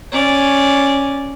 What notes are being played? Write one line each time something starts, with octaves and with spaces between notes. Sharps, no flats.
C#4 D5